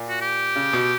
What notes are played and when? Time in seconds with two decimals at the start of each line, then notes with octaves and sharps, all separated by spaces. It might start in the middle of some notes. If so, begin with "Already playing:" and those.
Already playing: A#2
0.09 F#4
0.21 G4
0.56 C#3
0.73 B2